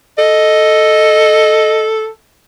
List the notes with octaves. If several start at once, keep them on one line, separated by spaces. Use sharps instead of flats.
A4 D#5